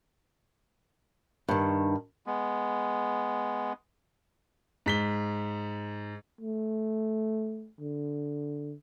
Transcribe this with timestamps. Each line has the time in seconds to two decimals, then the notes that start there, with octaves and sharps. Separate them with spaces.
1.49 G2 D#3
2.26 G#3 B3
4.86 G#2 B6 G7
6.41 A3
7.81 D3